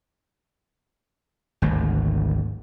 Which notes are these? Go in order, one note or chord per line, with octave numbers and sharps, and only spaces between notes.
G#1 D2